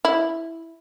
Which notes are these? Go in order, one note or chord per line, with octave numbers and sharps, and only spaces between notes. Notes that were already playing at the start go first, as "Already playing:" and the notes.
E4